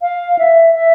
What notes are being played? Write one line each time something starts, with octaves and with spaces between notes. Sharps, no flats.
F5
E5
E5